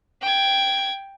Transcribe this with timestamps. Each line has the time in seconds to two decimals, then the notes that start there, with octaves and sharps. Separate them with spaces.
0.22 G5 G#6